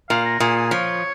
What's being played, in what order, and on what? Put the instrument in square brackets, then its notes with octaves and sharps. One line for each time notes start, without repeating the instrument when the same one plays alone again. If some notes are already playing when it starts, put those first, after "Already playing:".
[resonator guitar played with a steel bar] A#2 [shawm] F5
[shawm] A#4
[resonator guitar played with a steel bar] A#2 [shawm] G#4
[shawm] G#4
[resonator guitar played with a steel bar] F3 [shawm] C#5